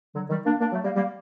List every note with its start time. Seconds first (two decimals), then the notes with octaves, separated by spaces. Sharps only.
0.15 D3 F#3
0.30 D#3 G3
0.46 A#3 D4
0.61 A#3 D4
0.72 F#3 A3
0.84 G3 A#3
0.96 G3 A#3